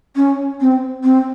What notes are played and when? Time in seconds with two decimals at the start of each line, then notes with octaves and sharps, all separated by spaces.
0.16 C#4
0.61 C4
1.04 C4